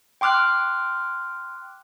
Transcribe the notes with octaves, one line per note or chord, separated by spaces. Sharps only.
G5 C6 D6 F6 F#6